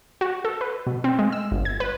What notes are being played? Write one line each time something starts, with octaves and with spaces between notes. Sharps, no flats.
F#4
A4
B4
B2
C4
G#3
E6
G1
G#6
B4